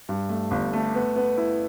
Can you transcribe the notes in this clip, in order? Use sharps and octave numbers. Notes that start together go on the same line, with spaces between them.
G2
A3
G1
A3
B3
B3
E4